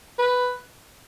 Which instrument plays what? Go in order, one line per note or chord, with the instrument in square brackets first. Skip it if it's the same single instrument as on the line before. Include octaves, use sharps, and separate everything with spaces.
[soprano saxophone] B4